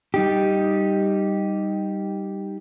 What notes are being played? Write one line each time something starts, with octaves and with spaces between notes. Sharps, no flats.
G3 D#4 G4